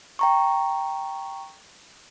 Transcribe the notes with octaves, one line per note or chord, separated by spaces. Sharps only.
G5 A#5 C#6